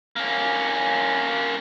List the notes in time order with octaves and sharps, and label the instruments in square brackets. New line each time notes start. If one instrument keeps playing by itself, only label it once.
[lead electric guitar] A#3 C#4